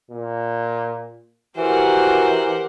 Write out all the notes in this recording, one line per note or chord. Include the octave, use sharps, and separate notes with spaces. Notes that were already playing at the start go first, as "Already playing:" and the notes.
A#2
E3 F#4 G4 A#4 C5 F#5